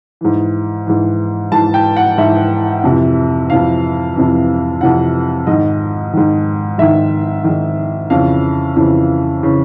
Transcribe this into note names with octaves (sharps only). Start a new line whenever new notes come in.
G#2 E3
G#2 E3
G#2 E3 A5
G5
F#5
G#2 E3 E5
F2 C3 E3
F2 C3 E3 F5
F2 C3 E3
F2 C3 E3 F#5
G#2 D#3 D#5
G#2 D#3
G#2 D#3 E5
D#3
G#2
F2 C#3 E3 F5
F2 C#3 E3
C#3 E3